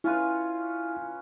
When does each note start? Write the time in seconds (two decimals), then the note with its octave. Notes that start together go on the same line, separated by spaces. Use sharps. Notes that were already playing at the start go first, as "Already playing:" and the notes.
0.04 C#4 E4 F4 B4